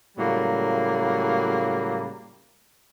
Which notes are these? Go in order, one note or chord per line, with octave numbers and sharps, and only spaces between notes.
A2 C#3 F#3 G3 A#3